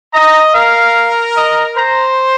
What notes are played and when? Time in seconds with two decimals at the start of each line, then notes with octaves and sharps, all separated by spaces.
0.13 D#5 A#5
0.54 A#4 F5
1.36 D#5
1.77 C5 A#5